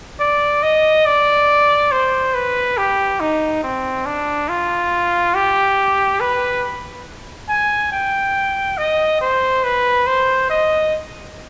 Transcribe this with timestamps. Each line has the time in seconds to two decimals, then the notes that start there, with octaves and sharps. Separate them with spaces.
0.20 D5
0.63 D#5
1.06 D5
1.92 C5
2.34 B4
2.77 G4
3.20 D#4
3.64 C4
4.06 D4
4.49 F4
5.35 G4
6.20 B4
7.49 G#5
7.92 G5
8.78 D#5
9.21 C5
9.64 B4
10.07 C5
10.50 D#5